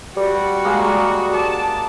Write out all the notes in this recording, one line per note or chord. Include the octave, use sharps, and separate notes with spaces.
G3 F#4
G#3 A#3
D5 A5